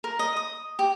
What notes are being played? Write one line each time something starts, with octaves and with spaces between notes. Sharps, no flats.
A#4
D#5
D#6
G4